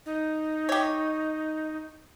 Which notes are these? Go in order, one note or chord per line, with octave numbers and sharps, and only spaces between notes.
D#4
G4 C#5